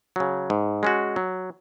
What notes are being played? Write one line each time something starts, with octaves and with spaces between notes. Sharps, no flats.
C#3 F#3
G#2
G#3 C#4 F#4
F#3